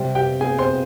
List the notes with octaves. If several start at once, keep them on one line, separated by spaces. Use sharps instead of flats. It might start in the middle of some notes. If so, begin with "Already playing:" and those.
Already playing: C3 G3 C4
G4 G5
G#4 G#5
C5 C6